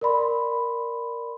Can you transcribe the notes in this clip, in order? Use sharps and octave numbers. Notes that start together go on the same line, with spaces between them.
A#4 D5 B5 C6